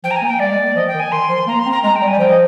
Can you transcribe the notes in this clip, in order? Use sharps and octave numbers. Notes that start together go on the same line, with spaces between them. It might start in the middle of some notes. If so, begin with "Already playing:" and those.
F3 G5
A#5
G#5
A#3
G5
G3 D5
G#3
A#3
F3 D#5
G5
D#3
G#5
D#3 C6
F3
A#3 A#5
C6
C4
A#5
G#3 A#5
G5
G3
G#5
G3
F3 G5
D#5